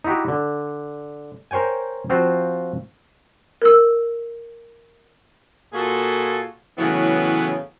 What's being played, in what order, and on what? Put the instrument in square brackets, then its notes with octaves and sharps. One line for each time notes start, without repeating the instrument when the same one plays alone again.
[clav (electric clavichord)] D#4 E4 F#4 G4
D3
A#4 C5 C#5 G5 G#5
F3 C4 F4 F#4 C5 F5
[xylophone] A#4 E6
[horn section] A#2 F4 F#4 G#4 A4
A2 C#3 E3 F#3 B3